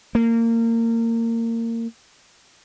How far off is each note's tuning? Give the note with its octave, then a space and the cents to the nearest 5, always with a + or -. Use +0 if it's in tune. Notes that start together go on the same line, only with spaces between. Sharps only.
A#3 -25